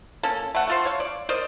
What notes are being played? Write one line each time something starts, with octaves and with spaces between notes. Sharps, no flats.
A#3 C#4 A4
A3 F#5
A3 F4 C5
C#5 F5
D5
A#4 C5 D5 D#5